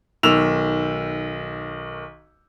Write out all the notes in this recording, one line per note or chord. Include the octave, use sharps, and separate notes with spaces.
B1 D#3 E6 E7 F7